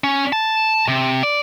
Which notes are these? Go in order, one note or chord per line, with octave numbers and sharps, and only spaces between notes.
C#4
A5
C3
D5